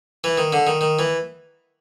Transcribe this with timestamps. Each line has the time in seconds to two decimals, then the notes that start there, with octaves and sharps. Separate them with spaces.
0.24 E3
0.38 D#3
0.53 D3
0.67 D#3
0.81 D#3
0.99 E3